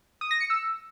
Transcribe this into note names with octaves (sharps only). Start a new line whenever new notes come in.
D#6
A#6
C#7
E6